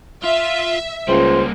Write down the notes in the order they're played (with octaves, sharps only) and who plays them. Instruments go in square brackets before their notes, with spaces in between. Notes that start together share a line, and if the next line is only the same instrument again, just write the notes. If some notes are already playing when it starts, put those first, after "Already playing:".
[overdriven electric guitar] F4 [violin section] E5
[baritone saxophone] C#2 [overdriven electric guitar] G3 A#3 [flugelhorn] C5